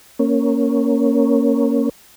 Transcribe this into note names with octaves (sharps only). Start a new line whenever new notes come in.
A#3 C#4